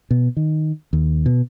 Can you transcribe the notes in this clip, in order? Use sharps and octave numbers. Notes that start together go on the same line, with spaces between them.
B2
D#3
D#2
B2